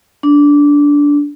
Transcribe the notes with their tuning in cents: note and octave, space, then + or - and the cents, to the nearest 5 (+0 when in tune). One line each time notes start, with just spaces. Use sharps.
D4 -15